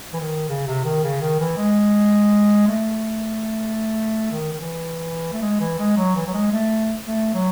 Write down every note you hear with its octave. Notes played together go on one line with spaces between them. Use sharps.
E3
D#3
C#3
C3
D#3
C#3
D#3
E3
G#3
A3
D#3
D#3
E3
A3
G#3
E3
G#3
F#3
E3
F#3
G#3
A3
A3
F#3